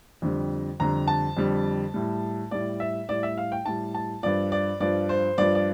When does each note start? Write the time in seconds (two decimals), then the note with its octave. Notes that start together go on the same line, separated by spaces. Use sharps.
0.22 F2 D3 G3
0.80 F2 D3 G3 A#5
1.08 A5
1.37 F2 D3 G3
1.94 A2 G3
2.51 A2 G3 D5
2.80 E5
3.09 A2 G3 D5
3.23 E5
3.38 F5
3.52 G5
3.66 A2 G3 A5
3.95 A5
4.23 G2 F3 D5
4.52 D5
4.80 G2 F3 D5
5.09 C5
5.38 G2 F3 D5
5.55 D5